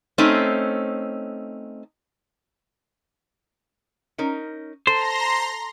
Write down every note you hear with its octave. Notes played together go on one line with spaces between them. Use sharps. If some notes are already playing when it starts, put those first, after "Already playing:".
A3 C4 C#4 D#4
C#4 D#4 A#4
A4 C5 A#5 C6 A#6